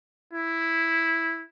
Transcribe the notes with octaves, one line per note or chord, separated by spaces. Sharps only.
E4